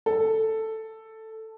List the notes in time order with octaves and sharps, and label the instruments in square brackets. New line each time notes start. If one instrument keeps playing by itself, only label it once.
[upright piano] A4